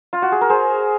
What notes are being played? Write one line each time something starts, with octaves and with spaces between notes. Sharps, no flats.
F4
F#4
G#4
A#4
G#4 C5